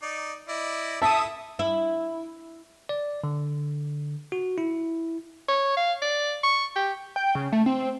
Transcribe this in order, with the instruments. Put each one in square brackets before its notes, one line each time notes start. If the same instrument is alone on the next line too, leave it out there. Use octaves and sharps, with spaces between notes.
[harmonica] D#4 D5
E4 D5 D#5
[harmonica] E4 A4 [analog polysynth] E5 D#6 [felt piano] A5
[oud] E4
[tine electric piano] D5
D3
F#4
E4
[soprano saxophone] C#5
F5
D5
C#6
G4
[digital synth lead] G5
C#3
A3
C4